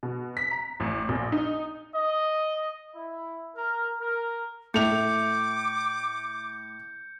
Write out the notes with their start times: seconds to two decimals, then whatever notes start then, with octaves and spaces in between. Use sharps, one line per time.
0.03 B2
0.37 B6
0.51 A#5
0.80 A1
1.09 A#1
1.32 D#4
1.94 D#5
2.95 E4
3.57 A#4
4.01 A#4
4.74 A2 A4 E5 D6 G6 C#7 F7